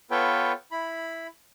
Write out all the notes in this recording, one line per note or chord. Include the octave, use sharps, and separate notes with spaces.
B3 F4 A4 B4 C#5 G5
E4 B5